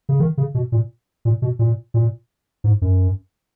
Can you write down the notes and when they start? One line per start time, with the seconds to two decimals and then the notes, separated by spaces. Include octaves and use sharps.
0.09 C#3
0.20 D#3
0.38 C#3
0.55 B2
0.72 A#2
1.25 A#2
1.42 B2
1.59 A#2
1.94 A#2
2.64 G#2
2.82 F#2